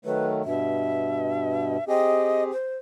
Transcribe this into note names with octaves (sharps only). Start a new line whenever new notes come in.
D#3 F#3 A3 B4
G2 B2 E5
C4 G4 G#4 D#5
C5